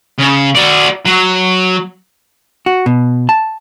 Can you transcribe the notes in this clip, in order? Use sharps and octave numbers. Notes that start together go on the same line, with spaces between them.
C#3
F#4 D5
F#3
F#4
B2
A5